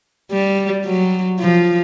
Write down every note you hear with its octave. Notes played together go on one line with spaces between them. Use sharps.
G3
F#3
F3